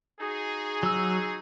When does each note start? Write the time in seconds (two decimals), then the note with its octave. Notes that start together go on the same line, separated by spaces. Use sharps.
0.20 D#4 F#4 G#4
0.83 F#3 E6